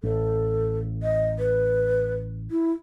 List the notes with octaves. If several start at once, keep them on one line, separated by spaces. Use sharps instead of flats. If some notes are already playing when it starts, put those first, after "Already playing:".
A1 A4
D#5
B4
E4